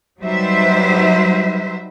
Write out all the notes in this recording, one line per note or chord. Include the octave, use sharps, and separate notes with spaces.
F#3 G3 D#4 B4 C5 E5